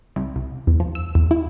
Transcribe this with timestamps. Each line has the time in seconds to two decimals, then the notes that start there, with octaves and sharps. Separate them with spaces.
0.16 C2
0.36 C2
0.67 E2
0.80 F3
0.95 E6
1.15 E2
1.31 E4